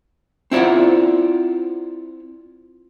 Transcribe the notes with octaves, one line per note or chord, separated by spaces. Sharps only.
C4 E4 F4 D5 F#5